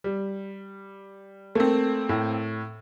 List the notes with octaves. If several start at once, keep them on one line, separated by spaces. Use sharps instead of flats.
G3
A3 A#3 C4
A2